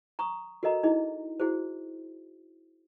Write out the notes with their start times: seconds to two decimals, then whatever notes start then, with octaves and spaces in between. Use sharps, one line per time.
0.19 A#5 C#6 D#6
0.63 F#4 A4 A#4 D#5 A#5
0.83 D#4 E4 G#4 D#5
1.40 E4 F#4 G#4 C5